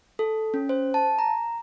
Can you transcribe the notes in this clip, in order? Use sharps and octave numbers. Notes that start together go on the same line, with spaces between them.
A4
C#4
C5
A5
A#5